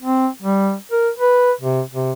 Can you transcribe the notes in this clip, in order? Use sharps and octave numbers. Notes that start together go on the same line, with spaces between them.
C4
G3
A#4
B4
C3
C3